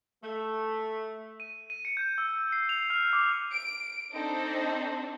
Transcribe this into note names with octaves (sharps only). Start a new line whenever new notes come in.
A3
D#7
D#7
C#7
G6
E6
C7
F7
F6
D6
D7
C4 D4 D#4 A4